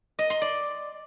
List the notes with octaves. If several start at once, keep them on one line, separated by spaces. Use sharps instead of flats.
D#5
C6
D5